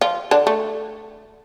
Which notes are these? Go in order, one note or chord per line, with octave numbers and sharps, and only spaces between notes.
F3 F4
D3 D4
A3